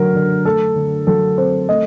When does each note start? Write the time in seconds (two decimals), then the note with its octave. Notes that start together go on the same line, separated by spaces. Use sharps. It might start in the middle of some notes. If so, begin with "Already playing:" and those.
Already playing: D3 F#3 A3 A#4
0.15 D3
0.45 A3 A4
0.76 D3
1.07 F#3 A4
1.38 C4 C5
1.69 A3 D#5